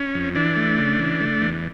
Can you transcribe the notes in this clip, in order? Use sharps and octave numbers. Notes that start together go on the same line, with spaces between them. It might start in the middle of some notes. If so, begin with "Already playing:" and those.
Already playing: C#4
F2
E3 D4
A3
C#3
E3
A3
E2